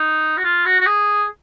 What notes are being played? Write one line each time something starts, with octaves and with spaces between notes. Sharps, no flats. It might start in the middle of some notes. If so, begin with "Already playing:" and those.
Already playing: D#4
F#4
F4
F#4
F#4
G#4